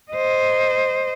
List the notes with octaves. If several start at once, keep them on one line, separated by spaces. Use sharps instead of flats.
C5 D#5